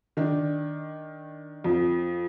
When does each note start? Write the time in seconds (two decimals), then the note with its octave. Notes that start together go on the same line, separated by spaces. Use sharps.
0.17 D#3 D4
1.64 F2